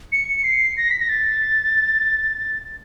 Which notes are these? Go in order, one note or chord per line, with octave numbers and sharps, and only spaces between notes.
C#7
C7
A#6
B6
A#6
A6